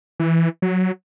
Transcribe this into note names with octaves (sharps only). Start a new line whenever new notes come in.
E3
F#3